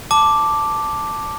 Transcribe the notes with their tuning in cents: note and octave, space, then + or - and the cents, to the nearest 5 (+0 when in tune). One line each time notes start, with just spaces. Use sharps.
A5 +0 D6 +0